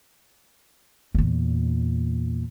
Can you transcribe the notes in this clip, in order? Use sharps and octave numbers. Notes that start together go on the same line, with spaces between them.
E2 A#2